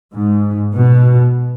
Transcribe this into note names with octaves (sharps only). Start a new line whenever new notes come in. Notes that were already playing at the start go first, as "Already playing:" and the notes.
G#2
B2